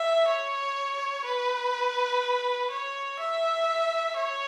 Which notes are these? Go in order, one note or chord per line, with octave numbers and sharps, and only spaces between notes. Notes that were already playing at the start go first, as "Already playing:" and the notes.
Already playing: E5
C#5
B4
C#5
E5
C#5